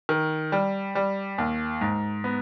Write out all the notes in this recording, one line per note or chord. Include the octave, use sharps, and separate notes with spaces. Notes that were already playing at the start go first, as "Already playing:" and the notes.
D#3
G3
G3
D#2
G#2
B3